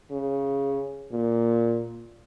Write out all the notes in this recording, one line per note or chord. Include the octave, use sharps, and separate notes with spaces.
C#3
A#2